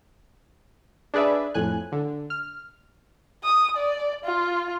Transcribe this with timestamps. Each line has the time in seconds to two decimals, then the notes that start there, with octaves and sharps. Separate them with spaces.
1.14 D4 G#4 B4 D5 E5
1.54 F2 A2 G#5 F#6
1.92 D3
2.30 F6
3.44 D#6
3.77 D5
4.24 F4